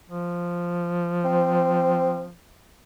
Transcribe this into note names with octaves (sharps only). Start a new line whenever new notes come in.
F3
C4